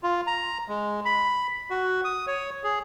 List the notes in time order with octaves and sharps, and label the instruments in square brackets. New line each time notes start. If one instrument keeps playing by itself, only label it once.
[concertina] F4
A#5
G#3
B5
F#4
D#6
C#5
G#4